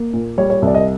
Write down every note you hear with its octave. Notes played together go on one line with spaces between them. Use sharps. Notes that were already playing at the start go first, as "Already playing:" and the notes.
Already playing: A#3
A#2
G3 C#5
C#5
C2 D5
D#5